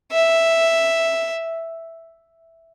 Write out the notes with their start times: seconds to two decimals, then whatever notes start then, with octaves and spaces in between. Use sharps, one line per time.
0.12 E5